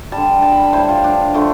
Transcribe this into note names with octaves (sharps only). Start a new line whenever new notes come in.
D3 G3 A5
A5
B5
A5
A2 G3 C5
F4
D4
D3 F3 A3